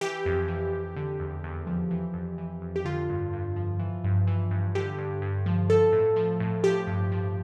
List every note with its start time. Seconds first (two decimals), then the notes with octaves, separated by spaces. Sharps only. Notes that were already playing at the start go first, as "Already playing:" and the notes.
0.01 E3 G4
0.26 F2
0.48 E3
0.72 F2
0.96 D3
1.20 E2
1.44 E2
1.67 F3
1.91 E3
2.14 F2
2.38 E3
2.62 F2
2.76 G4
2.85 D3 F4
3.10 G2
3.33 G2
3.56 F3
3.79 E3
4.04 G2
4.27 E3
4.51 G2
4.75 D3 G4
4.99 G2
5.22 G2
5.46 F3
5.70 F3 A4
5.92 A2
6.16 F3
6.40 A2
6.63 F3 G4
6.87 G2
7.12 F3